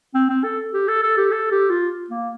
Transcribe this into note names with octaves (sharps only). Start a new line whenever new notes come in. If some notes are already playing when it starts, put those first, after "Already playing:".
C4
C4
A4
G4
A4
A4
G4
A4
G4
F4
A#3